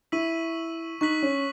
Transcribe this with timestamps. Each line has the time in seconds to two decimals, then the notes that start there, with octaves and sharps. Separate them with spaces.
0.12 E4 C#6 E6 B6 D#7 F#7
1.01 D#4 C#6 F#6 B6 F#7
1.22 C#4